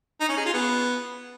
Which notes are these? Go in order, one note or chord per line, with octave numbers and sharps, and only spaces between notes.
D#4
C#4
G#4
F4
B3